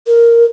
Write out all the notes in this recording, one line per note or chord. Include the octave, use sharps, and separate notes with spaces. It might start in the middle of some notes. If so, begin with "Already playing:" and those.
A#4